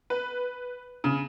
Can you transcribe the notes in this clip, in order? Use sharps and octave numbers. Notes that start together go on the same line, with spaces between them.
B4
C#3